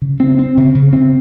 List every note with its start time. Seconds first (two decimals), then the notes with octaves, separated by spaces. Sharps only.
0.02 C#3
0.20 C4
0.39 C4
0.57 C#3
0.75 C#3
0.93 C4